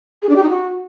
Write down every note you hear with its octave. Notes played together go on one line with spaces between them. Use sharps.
G#4
D4
G4
D#4
F#4